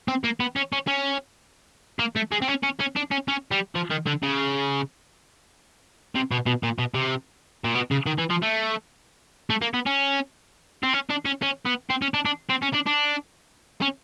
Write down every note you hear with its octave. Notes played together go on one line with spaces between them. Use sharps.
C4
A#3
B3
C#4
C#4
C#4
A#3
A3
G#3
C4
C#4
C#4
C#4
D4
C#4
C#4
G3
F3
D#3
D3
C#3
C3
B2
B2
A#2
B2
C3
A#2
B2
C#3
D#3
E3
F3
A3
A3
A#3
B3
C#4
C4
C#4
D4
C#4
C#4
B3
C4
C#4
D4
D4
C4
C#4
D4
D4
C#4